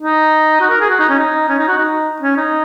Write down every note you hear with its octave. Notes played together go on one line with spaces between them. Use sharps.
D#4
F#4
A#4
G#4
F#4
D#4
C#4
D#4
C#4
D#4
F#4
D#4
C#4
D#4